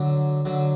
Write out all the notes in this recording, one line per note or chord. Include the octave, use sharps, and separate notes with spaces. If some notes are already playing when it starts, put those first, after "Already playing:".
Already playing: D3 F#3
D3 F#3